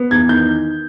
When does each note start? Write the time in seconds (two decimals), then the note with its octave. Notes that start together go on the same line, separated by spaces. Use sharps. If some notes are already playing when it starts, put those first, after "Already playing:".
Already playing: B3
0.11 E2 G#6
0.28 D#3 G6